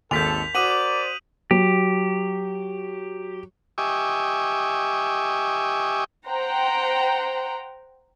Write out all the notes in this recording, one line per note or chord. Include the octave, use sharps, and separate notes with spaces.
G#1 D#2 A4 G6 B6 F7
F#4 A#4 C5 D5 D6 D#6 D#7 F#7
F#3 G4
G4 D#5 E5 G#5 C#6 D6
C5 F#5 G5 A#5